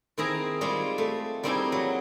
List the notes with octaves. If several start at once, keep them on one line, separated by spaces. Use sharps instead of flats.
D#3 C4 E4 G#4 A#5
G3 G#3 C4 F4
A3
G3 A#3 C4 D#4 E4 G#4
F#3